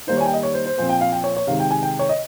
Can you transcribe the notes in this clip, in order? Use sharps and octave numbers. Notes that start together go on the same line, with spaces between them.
D#3 G3 A#3 D#4 C5
C#5
G#5
G5
D#5
C#5
C5
C5
A#2 F3 C4 C5
G5
F5
G5
C#5
C#5
C3 D#3 G#3 F5
G5
G#5
G5
C#5
D#5